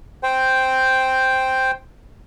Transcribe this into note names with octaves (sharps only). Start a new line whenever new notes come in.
C5 G5